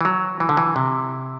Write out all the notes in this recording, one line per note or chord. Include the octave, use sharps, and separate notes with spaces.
E3
F#3
E3
D3
E3
C3